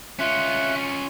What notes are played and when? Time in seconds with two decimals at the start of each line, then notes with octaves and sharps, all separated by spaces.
0.19 C#4 F4 E5 F#6